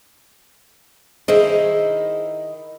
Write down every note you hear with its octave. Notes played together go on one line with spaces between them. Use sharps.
D#3 D#4 E4 G#4 C5